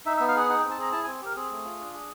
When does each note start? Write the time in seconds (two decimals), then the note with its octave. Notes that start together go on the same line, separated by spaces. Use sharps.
0.06 D#4 E5
0.17 E5
0.20 B3
0.28 F5
0.35 G#4 F#5
0.49 D#4 F#5
0.60 G5
0.64 C4
0.71 A5
0.78 G#4 A#5
0.92 E4 A5
1.04 G#5
1.07 C4
1.22 G4 A#4
1.36 C4 G#4
1.51 A3
1.65 F4
1.79 D4
1.94 G#4